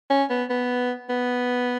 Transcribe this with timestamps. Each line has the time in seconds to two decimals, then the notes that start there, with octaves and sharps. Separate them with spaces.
0.10 C#4
0.30 B3
0.50 B3
1.09 B3